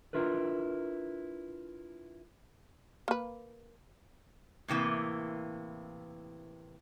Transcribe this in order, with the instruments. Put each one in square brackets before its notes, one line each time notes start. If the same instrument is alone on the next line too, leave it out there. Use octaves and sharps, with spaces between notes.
[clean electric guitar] D4 E4 F4 A#4 B4
[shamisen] A#3 B4
[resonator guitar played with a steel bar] A2 C3 E3 A#3